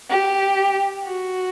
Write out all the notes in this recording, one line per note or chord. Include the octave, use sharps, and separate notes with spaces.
G4
F#4